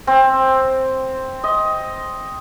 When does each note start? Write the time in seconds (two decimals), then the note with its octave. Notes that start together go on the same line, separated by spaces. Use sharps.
0.07 C4
1.44 D#5